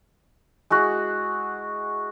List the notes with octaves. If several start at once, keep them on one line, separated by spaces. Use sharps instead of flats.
G#3 E4 F#4 G#4